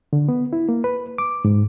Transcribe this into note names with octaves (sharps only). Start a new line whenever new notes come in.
D3
B3
E4
A#3
B4
D6
G#2